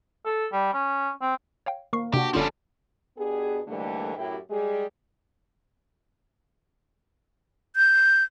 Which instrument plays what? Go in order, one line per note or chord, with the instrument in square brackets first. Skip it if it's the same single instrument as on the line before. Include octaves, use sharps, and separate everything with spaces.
[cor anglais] A4
G3
C#4
C4
[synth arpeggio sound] C#5 F5 G5
[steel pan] A#3 [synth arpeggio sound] A#4 C#6 C7
[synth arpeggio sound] C3 [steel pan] D4 F#4 [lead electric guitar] G4
[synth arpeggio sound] G1 F4 E7 [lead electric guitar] F3 G3 [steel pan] C#4 D4 A4
[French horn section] B2 B3 D4 G4 G#4
G#2 D3 E3 G3 A3 A#3
F#2 A2 E4 G4
G3 G#3 G4 G#4
[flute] G6